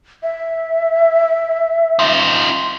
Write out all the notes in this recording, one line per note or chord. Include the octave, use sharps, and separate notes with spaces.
E5
D#4 F4